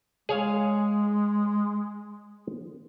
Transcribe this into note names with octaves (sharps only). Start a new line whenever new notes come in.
G#3 G#4 C#5 F5